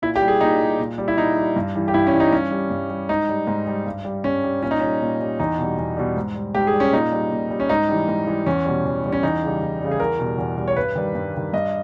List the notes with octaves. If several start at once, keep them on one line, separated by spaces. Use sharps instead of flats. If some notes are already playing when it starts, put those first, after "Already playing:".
A#2 E4
G4
G3
G#4
A#2 D#4
G3
A#2
G3
E4
A#2 D#4
G3
G2
E3 G3
G4
G2 E4
C#4
E3 G3
D#4
G2 C#4
G3
G2
G3
G#2 D#4
G3
G#2
G3
G2
G3
G2 C#4
G3
A#2 C#4
D#4
G3 C#4
A#2
G3
E2 D#4
B2 G3
E2
B2 G3
G#2
G3
G#2 G4
G#4
G3
C#4
A#2 D#4
G3
A#2
G3
C#4
G#2 D#4
E3 G3
G#2
E3 G3
E2 C#4
B2 G3
E2
B2 G3
C#4
E2 D#4
C#3 G3
E2
C#3 G3
G#4
E2 A#4
B2 G3
E2
B2 G3
C#5
G2 B4
D#3 G3
G2
D#3 G3
G2 D#5